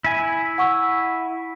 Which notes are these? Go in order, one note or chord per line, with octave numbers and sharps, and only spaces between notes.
E4 G#5
F#5 C#6 E6